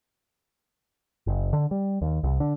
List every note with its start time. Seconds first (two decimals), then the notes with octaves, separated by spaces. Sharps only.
1.27 F#1
1.53 D3
1.71 G3
2.02 D#2
2.23 C2
2.40 D3